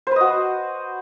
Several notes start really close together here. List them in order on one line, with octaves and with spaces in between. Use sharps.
C5 B4 D#5 F#4